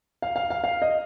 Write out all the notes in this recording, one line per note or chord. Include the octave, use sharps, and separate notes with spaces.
F5
F5
F5
F5
D#5